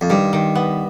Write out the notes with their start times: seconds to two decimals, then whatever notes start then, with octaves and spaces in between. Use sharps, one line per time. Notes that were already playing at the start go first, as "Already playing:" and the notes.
0.01 F2
0.10 G2 D#3
0.33 D#3
0.55 B3